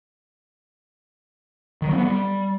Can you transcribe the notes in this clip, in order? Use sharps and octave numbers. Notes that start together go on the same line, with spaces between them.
D#3
F#3
C4
B3
G3